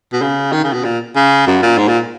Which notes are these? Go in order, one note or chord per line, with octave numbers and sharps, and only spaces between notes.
B2
C#3
D#3
C#3
B2
A#2
C#3
F#2
A#2
G#2
A#2